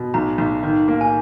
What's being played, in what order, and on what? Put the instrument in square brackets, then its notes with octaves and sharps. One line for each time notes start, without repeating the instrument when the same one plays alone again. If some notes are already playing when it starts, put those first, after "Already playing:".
Already playing: [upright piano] B2
[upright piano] B1 [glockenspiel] A#5
[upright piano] B1
D#3
A#3
[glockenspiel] G#5